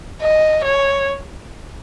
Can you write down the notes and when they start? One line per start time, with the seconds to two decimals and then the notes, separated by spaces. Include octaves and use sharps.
0.21 D#5
0.65 C#5